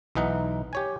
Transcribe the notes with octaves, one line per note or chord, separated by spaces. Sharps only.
B1 E3 D#4 F#5
G4 C#5 G#5